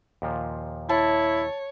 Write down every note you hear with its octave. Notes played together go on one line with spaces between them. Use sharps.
D#2 A#2 F3
E4 C#5 A5